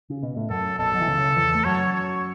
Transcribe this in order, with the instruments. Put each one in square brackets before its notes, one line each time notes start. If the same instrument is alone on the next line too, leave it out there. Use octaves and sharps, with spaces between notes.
[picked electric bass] C#3
B2
A2
[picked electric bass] F#2 [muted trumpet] A4
[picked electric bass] B1 B2 [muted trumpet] A4
[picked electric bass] F#3
E3
C#2 C#3
E2 E3
A3
[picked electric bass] F#2 F#3 [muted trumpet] C#5
[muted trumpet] C#5